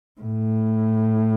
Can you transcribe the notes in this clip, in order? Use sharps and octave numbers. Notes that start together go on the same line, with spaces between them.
A2